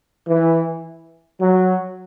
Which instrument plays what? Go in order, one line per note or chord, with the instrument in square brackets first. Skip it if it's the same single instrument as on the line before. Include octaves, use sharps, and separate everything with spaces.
[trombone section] E3
F#3